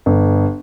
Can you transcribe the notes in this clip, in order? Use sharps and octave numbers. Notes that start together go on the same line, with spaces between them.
G1